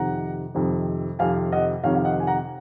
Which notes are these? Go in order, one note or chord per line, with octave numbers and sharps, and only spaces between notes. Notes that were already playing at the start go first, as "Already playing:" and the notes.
Already playing: F2 C3 D#3 F#5 A#5
F2 C3 D#3
F2 C3 D#3 F5 G#5
D#5 F#5
F2 C3 D#3 C#5 F5
F5
D#5 F#5
G#5
F#5 A#5